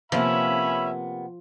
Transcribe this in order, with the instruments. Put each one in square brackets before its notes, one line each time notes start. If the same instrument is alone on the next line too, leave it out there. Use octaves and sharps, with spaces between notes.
[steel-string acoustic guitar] C3 A#3 B3 [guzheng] F3 [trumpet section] C#4 E5 [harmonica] B5